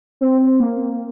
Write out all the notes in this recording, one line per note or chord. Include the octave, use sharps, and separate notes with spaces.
C4
A#3